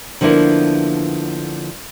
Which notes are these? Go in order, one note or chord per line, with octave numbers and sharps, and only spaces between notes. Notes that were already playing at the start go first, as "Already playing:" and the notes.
D3 F3 A#3 B3 E4